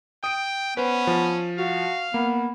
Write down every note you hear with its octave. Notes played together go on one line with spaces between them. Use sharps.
G5 D#6 D7
B3 C#4 B4 C5
F3
F#4 F5
A#3 B3